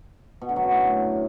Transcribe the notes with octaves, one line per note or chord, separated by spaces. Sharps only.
B2
D3
F#3
F#2
A2